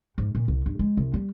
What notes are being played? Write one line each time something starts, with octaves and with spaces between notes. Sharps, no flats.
G#2
A#2
C2
G2
G#3
C2
G3